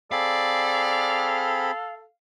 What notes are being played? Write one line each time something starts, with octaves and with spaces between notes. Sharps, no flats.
C4 G#4 A4 D5 F5 B5